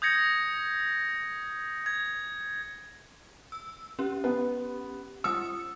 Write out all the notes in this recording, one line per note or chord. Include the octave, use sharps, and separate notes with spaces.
D#6 G6 G#6 A#6 C#7
G#6
E6
C#4 G4
B3
G3 D#6 E6 C#7